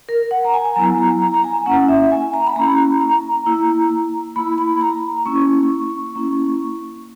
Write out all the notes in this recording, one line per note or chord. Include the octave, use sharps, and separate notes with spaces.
A#4
F#5
A#5
G#5
G#5
F#3 B3 E4 A#5
A#5
A#5
A#5
G#5
A#3 C#4 E4 F#5
E5
G#5
A#5
B5
A#3 C#4 E4 A#5
A#5
A#3 E4
A#3 E4 B5
B5
A#5
A#3 C#4 E4 C#6
A#3 C#4 E4